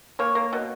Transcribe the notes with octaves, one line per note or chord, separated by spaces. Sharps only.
A#3 C#5
A#3
B2